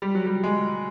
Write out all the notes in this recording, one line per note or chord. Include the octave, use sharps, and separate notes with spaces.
G3
F#3
G3
G#3